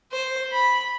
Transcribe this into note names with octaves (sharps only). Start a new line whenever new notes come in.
C5
B5